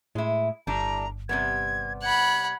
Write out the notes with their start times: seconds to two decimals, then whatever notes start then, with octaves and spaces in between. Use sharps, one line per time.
0.15 A2 G#3 E4
0.67 G1 A2 G3 D4 A#5
1.29 C3 G3 B3 G#6
2.02 F#5 B5 G#6